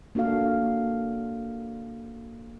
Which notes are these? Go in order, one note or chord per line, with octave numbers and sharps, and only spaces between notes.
A#3 D4 F#4 A4 F5